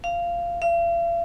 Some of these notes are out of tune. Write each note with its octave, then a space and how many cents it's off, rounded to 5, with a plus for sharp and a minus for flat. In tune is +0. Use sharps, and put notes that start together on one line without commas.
F5 -15
F5 -45